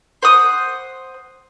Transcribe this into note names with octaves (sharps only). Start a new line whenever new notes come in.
C5 F#5 D#6